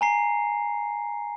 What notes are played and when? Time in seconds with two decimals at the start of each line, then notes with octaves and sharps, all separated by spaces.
0.01 G#5 A#5 C7